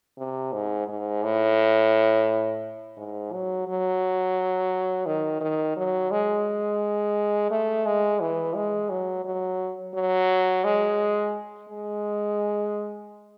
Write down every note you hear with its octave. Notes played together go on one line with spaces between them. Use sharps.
C3
G#2
G#2
A2
G#2
F#3
F#3
D#3
D#3
F#3
G#3
A3
G#3
E3
G#3
F#3
F#3
F#3
G#3
G#3